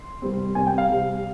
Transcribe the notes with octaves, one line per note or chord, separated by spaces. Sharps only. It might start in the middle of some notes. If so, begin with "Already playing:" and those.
Already playing: C6
C2 C3 G3 C4
C2 C3 G3 C4 G#5
G5
F5
C2 C3 G3 C4